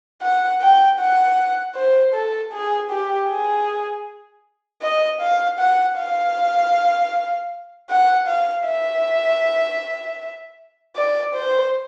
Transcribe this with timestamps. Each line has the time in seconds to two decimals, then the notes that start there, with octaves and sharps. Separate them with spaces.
0.22 F#5
0.61 G5
0.99 F#5
1.75 C5
2.14 A4
2.53 G#4
2.90 G4
3.29 G#4
4.82 D#5
5.21 F5
5.59 F#5
5.97 F5
7.89 F#5
8.27 F5
8.66 E5
10.96 D5
11.35 C5